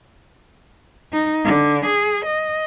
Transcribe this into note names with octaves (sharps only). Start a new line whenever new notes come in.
D#4
D3
G#4
D#5